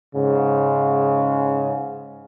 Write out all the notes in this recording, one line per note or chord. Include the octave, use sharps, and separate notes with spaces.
G#2 C#3